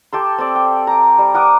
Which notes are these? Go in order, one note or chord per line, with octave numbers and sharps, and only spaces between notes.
G4 A4 C6
C4 A4 D5
G5
A#5
G3
A#4 F#5 D6 D#6